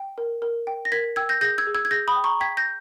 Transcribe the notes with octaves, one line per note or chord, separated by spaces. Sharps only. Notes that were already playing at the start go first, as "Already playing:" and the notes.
Already playing: G5
A#4
A#4
G5
A#6
A#4 G#6 B6
G5 E6 G#6
G6 A#6
G#4 G6 A#6
E6 G#6
G#4
E6 G#6
G#6
G#4 G6 A#6
B5 D#6
G5
A#5 C#6
G5 G#6 B6
G6 A#6